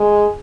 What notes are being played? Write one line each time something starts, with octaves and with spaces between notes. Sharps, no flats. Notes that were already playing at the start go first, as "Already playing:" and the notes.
Already playing: G#3